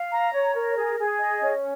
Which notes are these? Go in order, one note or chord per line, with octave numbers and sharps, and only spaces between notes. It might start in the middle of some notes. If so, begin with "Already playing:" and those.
Already playing: F5
A#5
C#5
A#4
G#4
G#4
D#5
C#4